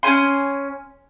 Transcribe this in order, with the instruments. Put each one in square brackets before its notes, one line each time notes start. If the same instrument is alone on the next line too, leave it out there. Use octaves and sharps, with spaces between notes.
[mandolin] C#4 E4 G#5 C6